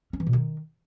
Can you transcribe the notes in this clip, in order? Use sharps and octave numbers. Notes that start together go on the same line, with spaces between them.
C#4
E3
B2
D#3